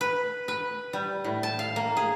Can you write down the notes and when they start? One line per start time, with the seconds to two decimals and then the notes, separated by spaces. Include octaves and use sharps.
0.01 B4
0.48 B4
0.93 G3
1.24 A2
1.43 A5
1.59 F5
1.76 A#3
1.97 G#4